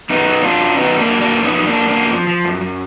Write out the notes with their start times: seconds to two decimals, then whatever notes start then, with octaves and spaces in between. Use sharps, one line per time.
0.10 F#2 B3 D#4
0.26 F#2
0.43 F#2 D4 F4
0.60 F#3
0.76 D#3 B3 D#4
0.94 F#2 A#3 D4
1.10 F#3
1.21 A#3 D4
1.27 F#2
1.43 F3 B3 D#4
1.61 F#2
1.66 A#3 D4
1.78 F#2
1.88 A#3 D4
1.94 F#2
2.11 F3
2.27 F3
2.45 F#2
2.61 F#2